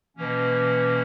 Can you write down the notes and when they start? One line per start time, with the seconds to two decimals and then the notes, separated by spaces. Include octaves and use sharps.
0.17 B2 E3 A#3 C#4